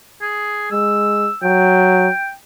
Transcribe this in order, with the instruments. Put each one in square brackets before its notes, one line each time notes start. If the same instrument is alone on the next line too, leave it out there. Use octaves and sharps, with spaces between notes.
[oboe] G#4
[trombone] G#3 [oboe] E6
[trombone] F#3 [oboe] G5